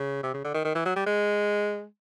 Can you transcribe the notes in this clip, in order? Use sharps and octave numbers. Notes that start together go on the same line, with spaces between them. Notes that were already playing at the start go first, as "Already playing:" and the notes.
Already playing: C#3
C3
C#3
D3
D#3
D#3
E3
F#3
G3
G#3